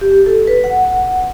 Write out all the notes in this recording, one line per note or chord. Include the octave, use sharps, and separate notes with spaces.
G4
A4
B4
F#5